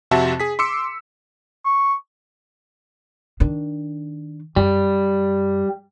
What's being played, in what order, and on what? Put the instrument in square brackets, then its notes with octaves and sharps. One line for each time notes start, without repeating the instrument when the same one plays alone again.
[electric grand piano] F2 C3 C4 F#4 E5 A5
G#4 B6
C6 D6 E6 C#7
[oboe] C#6
[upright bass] D#3 D4
[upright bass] F#2 [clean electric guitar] G3